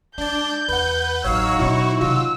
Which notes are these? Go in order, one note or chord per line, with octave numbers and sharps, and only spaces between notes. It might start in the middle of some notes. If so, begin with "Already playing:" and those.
G#3 D4 D5 G6
E2 B4 F#5
A1 F#3 C4 D#4 F#4 C#5 F5 E6
B2 C#4 E4 C#5
C3 D#3 F4 E6